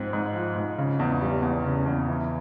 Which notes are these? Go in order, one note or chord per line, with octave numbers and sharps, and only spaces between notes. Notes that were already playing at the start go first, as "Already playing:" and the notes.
Already playing: G#2 F3 C4
G#2
F3
G#2
C#3
E2
G3
E2
C#3
E2
E3